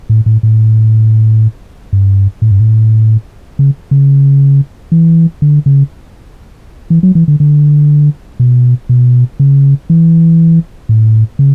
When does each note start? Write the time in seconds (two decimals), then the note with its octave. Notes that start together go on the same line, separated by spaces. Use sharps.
0.10 A2
0.26 A2
0.43 A2
1.93 G2
2.42 A2
2.51 G2
2.60 A2
3.59 C#3
3.91 C#3
4.92 E3
5.42 D3
5.66 C#3
6.90 E3
7.03 F#3
7.15 E3
7.28 D3
7.40 D3
8.40 B2
8.89 B2
9.40 C#3
9.90 E3
10.89 A2
11.39 C#3